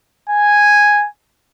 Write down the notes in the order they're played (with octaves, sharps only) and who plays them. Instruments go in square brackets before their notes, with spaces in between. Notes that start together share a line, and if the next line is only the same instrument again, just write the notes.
[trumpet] G#5